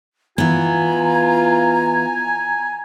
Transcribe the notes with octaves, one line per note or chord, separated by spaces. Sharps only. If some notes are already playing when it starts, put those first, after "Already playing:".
E3 B3 F4 G#5 A#5